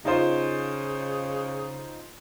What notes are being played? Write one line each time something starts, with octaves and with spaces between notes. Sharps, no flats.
C#3 D#4 F4 C5